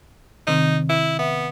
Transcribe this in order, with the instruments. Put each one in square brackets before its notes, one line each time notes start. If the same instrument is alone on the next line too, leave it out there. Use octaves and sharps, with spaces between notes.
[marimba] C3 D#3 C4 [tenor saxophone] D#4
[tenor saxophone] E4
[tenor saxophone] B3 [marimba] E5